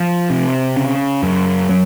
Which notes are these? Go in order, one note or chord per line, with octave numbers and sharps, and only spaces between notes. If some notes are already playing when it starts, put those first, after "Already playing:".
Already playing: F3
C3
C#3
F#2
F#3